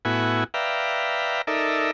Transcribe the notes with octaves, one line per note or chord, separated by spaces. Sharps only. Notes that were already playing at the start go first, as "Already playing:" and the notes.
A2 B3 E4 F#4 G#5
B4 D5 E5 F5 G5 A#5
D#4 A4 A#4 D5 E5